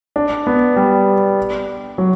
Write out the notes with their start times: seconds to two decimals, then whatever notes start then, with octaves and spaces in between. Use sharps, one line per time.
0.16 D4
0.47 B3
0.76 G3
1.98 F#3